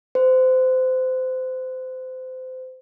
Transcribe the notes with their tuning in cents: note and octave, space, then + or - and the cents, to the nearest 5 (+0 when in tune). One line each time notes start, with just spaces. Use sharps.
C5 -25